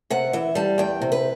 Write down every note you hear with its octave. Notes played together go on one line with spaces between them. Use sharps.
C3 F#5
E3 E5
G3 A5
E2 G5
C3
B4